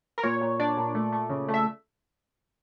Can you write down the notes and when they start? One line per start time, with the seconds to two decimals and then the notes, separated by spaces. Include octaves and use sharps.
0.18 A#4
0.23 A#2 C#5
0.41 A#2
0.60 D4 D5
0.77 A#2
0.95 A3
1.12 A3
1.29 C#3
1.48 A3
1.54 E5